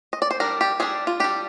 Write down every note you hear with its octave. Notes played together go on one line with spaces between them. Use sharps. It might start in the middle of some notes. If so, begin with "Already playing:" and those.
D#5
D5
C5
G3 D4 A#4
G4
G3 D4 G#4
F4
G3 D4 G4